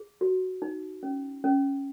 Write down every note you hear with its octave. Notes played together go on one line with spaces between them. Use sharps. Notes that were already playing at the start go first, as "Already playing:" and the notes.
Already playing: G#4
F#4
D#4
C#4
C#4